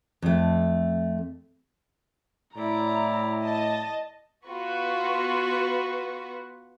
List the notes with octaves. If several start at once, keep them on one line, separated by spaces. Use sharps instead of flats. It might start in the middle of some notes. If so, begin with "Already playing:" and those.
F2 A3
A2 E4 D5 A#5
D#5 A5
B3 F4 F#4 B4 C#6